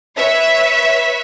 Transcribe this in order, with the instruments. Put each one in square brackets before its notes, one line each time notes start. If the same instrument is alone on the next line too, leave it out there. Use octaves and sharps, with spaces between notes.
[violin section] B4 C#5 E5